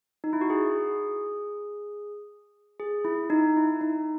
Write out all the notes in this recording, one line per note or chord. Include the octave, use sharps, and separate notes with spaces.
D#4
E4
F#4
G#4
G#4
E4
D#4
E4
D#4